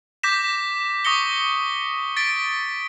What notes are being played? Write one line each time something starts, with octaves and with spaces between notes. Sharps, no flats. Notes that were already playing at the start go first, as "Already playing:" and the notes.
D6 G6 A#6 B6 E7
C#6 D#6 A#6 C#7 G7
A6 B6 D7